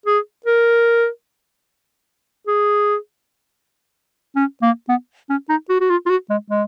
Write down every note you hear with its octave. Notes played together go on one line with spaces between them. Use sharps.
G#4
A#4
G#4
C#4
A#3
B3
C#4
D#4
F#4
F#4
F4
F4
F#4
G#3
G#3